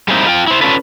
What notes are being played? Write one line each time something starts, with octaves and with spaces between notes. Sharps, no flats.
G3 G#3 A#3 C4 D#4 E4
F4 G5
E4 C5
C#4 D4 F4 A4 B4